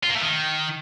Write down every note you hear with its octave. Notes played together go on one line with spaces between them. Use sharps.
F4
A#3
A3
D#3